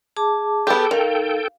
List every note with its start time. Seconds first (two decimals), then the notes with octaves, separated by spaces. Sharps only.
0.17 G#4 A5 D6
0.67 B3 G4 A4 G5
0.91 D#3 F5